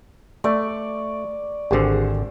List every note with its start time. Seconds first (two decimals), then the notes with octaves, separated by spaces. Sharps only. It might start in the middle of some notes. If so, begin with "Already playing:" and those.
0.44 A3 D5 C#6
1.71 G#1 D3 G4 G#4 C5